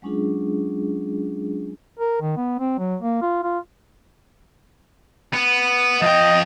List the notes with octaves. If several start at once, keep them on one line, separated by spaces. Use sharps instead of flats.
F#3 G#3 C#4 D4 F4 G#4
A#4
D#3
B3
C4
F#3
A#3
F4
F4
B3
F3 D#5 G5